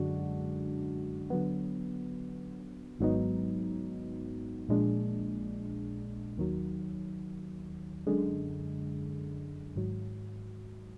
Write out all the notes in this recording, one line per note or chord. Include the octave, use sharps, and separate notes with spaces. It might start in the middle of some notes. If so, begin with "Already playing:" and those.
Already playing: F#2 D3 G#3 D4 F#4
D3 F#3 B3
G#1 G#2 F#3 B3 D#4
A#1 A#2 G#3 D4
D#2 D#3 F#3
F#2 D3 G#3
G#1 G#2 F#3